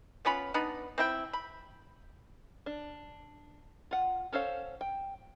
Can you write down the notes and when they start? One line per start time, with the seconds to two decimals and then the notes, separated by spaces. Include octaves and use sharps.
0.25 B3 C#4 F4 B5
0.54 B3 D4 D#4 B5
0.98 C4 E4 G5
1.33 B5
2.66 D4
3.91 F4 F#5
4.32 C#4 A4 C5 C#5 F5
4.81 G5